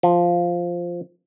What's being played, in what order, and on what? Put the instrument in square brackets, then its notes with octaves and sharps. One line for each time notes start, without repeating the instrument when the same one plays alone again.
[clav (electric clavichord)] F3